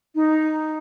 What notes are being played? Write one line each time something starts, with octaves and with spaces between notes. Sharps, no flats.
D#4